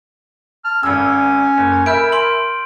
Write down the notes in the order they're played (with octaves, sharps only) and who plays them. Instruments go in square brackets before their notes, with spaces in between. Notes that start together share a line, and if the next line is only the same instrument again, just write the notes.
[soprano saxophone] A5 [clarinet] F6
[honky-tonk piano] G#1 E6 [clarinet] C#4 [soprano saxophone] G#5
[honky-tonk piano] F#1
[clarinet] A#4 [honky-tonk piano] E5 B5 [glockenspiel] F6 G6 D7
[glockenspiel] C6 D7 F#7